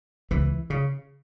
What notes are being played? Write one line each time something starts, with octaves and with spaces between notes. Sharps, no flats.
C#2 E3
C#3